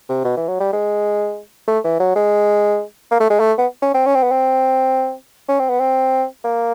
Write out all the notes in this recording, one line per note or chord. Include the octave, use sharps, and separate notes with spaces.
C3
B2
E3
F#3
G3
G#3
A3
E3
F#3
G#3
A#3
A3
G#3
A3
B3
C#4
C4
C#4
C4
B3
C4
C#4
C4
B3
C4
A#3